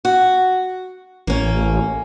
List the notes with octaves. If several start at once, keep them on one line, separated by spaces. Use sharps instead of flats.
F#4
A1 A#3 C#4